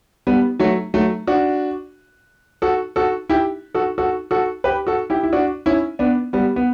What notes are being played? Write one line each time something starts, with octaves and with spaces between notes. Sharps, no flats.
G3 B3
F#3 A3
F#3 A3
D4 F#4
F#4 A4
F#4 A4
E4 G4
F#4 A4
F#4 A4
F#4 A4
G4 B4
F#4 A4
E4 G4
E4
D4 F#4
C#4 E4
B3 D4
G3 B3
B3